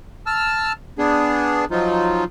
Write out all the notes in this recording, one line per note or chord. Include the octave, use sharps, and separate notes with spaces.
A5 E6 F6
B3 D4 G#4
F3 F#3 D#4 F4